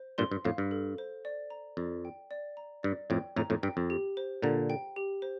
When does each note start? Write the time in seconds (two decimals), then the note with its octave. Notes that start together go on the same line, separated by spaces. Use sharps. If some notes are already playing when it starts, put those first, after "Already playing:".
Already playing: C5
0.18 G2 A#2 C6
0.32 G2
0.45 F2 A2 F5
0.58 G2
0.71 A4
0.98 C5
1.25 D5
1.50 A#5
1.77 F2 D5
2.05 G5
2.31 D5
2.57 A#5
2.83 G2 D5
3.10 F2 A2 G5
3.36 F2 A2 A#5
3.50 F2 A2
3.63 G2 G5
3.77 F2
3.90 G4
4.17 C5
4.42 A#2 D3 A#5
4.70 G5
4.96 G4
5.22 C5